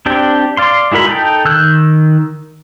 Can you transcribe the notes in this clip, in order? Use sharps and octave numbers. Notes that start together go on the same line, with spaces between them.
C4 D4 G4 G5
D5 F5 C6
G#3 E4 F#4 A#4 B5
D#4 A4 G5
D#3 E6 F#6 G6